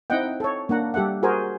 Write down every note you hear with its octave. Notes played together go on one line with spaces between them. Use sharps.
C4 D#4 E4 D#5 F#5 G5
A4 C#5
A#3 D4 F#5 A#5
G3 G4 A4 E5 F#5
F#4 G#4 A#4 C5 G#5